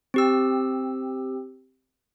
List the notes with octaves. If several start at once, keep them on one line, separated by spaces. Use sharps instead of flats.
C4 G4 E6